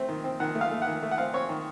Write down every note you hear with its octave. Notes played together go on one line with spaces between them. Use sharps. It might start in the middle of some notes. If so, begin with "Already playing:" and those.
Already playing: A3 C4
D#3
C4
D#3 F#5
A3
F5
A3
F#5
D#3
A3
F#5
C4 F5
C4 C#5
D#3